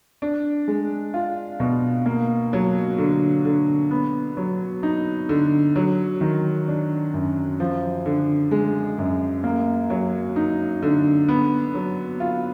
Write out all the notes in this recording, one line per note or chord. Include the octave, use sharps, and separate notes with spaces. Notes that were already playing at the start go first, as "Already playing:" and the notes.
D4
G#3
F4
B2
A#3
F#3
D3
D3
B3
F#3
D#4
D3
F#3
D#3
D4
F#2
F3
D3
G#3
F#2
A#3
F#3
D#4
D3
B3
F#3
F4